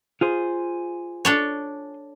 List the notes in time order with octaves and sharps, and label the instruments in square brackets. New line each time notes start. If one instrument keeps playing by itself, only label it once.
[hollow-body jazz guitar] F4 G#4 C5
[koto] D4 A4 C#5